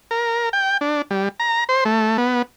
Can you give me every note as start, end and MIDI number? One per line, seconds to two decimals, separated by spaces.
0.11 0.49 70
0.53 0.77 79
0.81 1.02 62
1.11 1.29 55
1.40 1.64 82
1.69 1.84 72
1.85 2.17 57
2.18 2.42 59